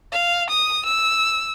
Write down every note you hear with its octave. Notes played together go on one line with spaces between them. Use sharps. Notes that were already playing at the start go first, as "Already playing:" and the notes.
F5
D#6
E6